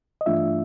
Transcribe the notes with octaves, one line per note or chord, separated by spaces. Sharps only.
D#5
G2 E3 A3 D4 F4 E5